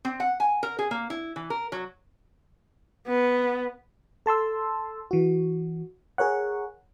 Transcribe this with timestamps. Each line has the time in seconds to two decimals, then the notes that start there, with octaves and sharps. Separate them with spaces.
0.05 C4
0.20 F#5
0.40 G#5
0.63 A#4
0.79 G#4
0.91 A#3
1.10 E4
1.36 E3
1.50 A#4
1.72 F#3
3.07 B3
4.26 A4 A5 C6 E6
5.11 E3 F#4
6.18 G#4 A#4 C#5 F#5